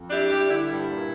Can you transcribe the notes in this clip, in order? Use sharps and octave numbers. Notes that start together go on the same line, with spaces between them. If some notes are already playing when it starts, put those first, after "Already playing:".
Already playing: F2
D4 E4 G4
G3 E4 G4
D3 E4
G2
A#2